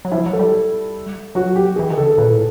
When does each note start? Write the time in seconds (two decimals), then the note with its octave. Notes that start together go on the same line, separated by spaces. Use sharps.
0.05 F#3
0.11 F3 E4
0.26 F#3
0.33 A4
0.39 G3
1.35 F#3 F#4
1.56 G4
1.76 E3 G#4
1.90 D#3
1.98 C#3 A4
2.04 D3
2.17 A#2 B4
2.32 A2